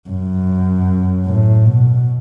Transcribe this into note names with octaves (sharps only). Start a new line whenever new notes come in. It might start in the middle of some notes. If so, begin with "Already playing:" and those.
F#2
A2
B2